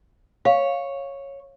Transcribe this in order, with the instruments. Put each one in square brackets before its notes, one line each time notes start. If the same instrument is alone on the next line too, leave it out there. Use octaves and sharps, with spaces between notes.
[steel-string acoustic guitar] C#5 [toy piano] F5